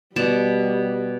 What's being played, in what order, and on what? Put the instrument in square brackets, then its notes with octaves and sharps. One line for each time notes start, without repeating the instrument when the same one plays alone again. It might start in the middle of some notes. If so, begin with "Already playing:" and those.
[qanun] B2 D5 A5 [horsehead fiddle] G3